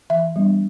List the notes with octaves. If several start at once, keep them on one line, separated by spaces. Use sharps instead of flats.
E3 E5
G3 B3 D4